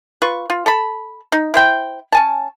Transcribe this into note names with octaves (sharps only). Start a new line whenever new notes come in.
F4 B4 C#6
F4
A4 A5 B5
D#4
E4 C5 G5
C#4 G#5 A5